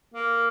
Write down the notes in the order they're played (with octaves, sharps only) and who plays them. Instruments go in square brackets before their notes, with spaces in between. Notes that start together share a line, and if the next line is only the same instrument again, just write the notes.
[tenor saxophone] A#3